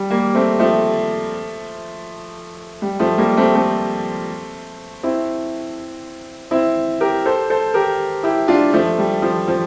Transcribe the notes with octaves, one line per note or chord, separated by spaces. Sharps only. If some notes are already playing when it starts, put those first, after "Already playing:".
Already playing: G3
G3 A#3
A3 C4
F3 A3
G3
F3 A3
G3 A#3
A3 C4
A3 C4
C4 E4
C4 E4
G4 A#4
A4 C5
A4 C5
G4 A#4
E4 G4
D4 F4
F3 A3
G3
F3
F3